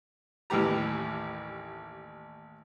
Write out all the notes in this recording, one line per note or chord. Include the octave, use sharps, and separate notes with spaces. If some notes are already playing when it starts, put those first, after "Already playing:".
A1 D#2 A2 E3 G4 A#5